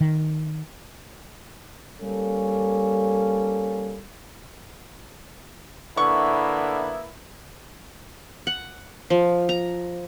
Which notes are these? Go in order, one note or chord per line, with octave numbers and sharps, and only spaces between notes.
D#3
G3 A#3 C#4 A4
D3 A#3 B3 E4 C#6
F#5
F3
A#5